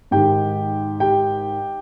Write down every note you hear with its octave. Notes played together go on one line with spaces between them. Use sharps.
G#2 D#3 G4 G5
G4 G5